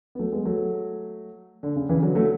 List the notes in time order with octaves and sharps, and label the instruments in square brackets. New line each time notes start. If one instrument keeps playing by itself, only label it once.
[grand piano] B3
F#3 A3
G#3 B3
F#3 A3
D3
C#3
C#3 E3
D3 F#3
F#3 A3